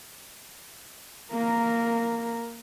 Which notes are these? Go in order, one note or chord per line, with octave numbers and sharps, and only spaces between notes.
A#3 A#4